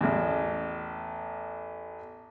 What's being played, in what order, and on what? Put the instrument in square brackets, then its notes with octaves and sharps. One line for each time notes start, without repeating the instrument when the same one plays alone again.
[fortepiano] A1 E2